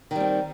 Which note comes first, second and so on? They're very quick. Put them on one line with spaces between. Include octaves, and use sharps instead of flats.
D#3 G3 C4